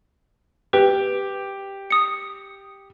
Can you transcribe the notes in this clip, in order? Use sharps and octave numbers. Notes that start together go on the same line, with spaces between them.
G4 B4
D#6 C#7